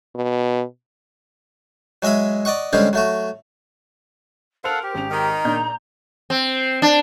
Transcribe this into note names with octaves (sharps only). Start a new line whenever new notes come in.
B2
F#3 G#3 D#5 E5 B5
D5 D#5 F#5 C#6
D3 G3 G#3 C4 C#4
F#3 A3 F#4
A4 A#4 C5 F5 F#5 F7
G4
G#1 C#4 F7
D#3 A#5
A#2 D4 D#4 G6
C4
D4